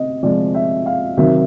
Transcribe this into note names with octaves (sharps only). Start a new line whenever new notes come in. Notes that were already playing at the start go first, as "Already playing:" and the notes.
Already playing: C3 D#5
C3 F3 G#3 D5
E5
F5
C3 D#3 F#3 E5